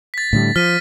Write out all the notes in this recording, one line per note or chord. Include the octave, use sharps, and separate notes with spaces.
A6 B6
A2 D3 G3
F3 F6 B6 D#7